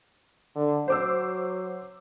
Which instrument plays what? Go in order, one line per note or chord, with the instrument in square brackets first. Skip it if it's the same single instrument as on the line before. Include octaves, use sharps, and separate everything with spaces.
[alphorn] D3
[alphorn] F#3 [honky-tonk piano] C5 D6 E6